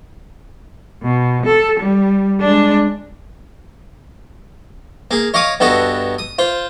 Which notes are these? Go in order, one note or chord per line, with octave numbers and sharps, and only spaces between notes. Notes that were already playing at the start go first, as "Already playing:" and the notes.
B2
A4
G3
G#3 D4
A#3 G#4
C#5 D#5 F5 D6 D#6
G2 B3 F#4 A4 D#5
D#6
F4 C5